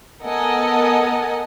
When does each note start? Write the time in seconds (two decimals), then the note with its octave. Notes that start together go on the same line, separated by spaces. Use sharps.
0.23 B3 A4 A#4 D#5 F#5 G#5